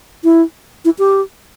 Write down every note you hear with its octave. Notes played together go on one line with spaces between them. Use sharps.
E4
E4
G4